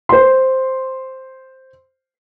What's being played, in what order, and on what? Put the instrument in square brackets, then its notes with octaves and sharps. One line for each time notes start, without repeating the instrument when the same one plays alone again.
[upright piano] C5 C6